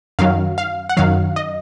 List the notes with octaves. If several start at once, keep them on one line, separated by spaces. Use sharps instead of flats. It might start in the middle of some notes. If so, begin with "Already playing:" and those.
F#2 D#3 F#3 F5
F5
F#5
F#2 D#3 F#3 F5
D#5